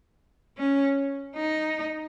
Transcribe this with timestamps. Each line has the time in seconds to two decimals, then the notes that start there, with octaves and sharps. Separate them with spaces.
0.57 C#4
1.36 D#4